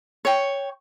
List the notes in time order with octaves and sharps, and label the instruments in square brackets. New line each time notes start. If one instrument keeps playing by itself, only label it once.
[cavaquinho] C#5 G5